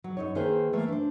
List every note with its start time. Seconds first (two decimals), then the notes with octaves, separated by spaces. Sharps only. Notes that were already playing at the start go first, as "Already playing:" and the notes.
0.04 F#3
0.17 F#2 D#4 C#5
0.35 D#3 A#3 E4 G#4 B4 C5
0.73 E3 A3 A#3
0.88 D4 C5